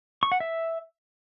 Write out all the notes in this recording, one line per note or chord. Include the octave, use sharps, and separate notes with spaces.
C#6
F#5
E5